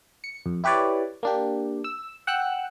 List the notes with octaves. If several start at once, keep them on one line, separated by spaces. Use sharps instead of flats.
C#7
F2
E4 G4 B4 C#5 D5
A#3 D4 G4
E6
F#5 G5 E6 F#6